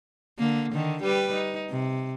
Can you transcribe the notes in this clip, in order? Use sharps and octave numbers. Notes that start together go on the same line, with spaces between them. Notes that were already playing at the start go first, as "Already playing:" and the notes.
D3 A#3
D3 D#3
G3 G4 B4
D#4
C3